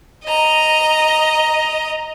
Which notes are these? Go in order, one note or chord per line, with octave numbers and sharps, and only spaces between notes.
D#5 A#5